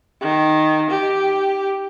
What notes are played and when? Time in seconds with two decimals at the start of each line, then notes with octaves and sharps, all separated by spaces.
0.21 D#3
0.90 G4